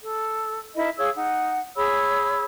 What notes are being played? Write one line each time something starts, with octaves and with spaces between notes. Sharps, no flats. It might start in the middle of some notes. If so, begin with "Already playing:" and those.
A4
D#4 E4 A#4 D#5
G#4 C#5 F5 E6
D#4 F#5
G#4 C#5 B5 E6